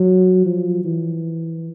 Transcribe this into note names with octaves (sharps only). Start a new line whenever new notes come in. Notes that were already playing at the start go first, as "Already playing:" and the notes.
Already playing: F#3
F3
E3